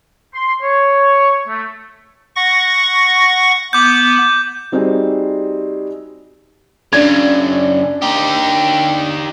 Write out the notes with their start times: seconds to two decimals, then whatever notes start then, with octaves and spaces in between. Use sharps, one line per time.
0.34 C6
0.62 C#5
1.48 A3
2.36 F#5 C#6 A#6
3.73 B3 D6 G6
4.72 G3 C4 D#4 F#4 G#4
6.93 F#2 C#3 D4 D5 G#6
8.02 D#4 G4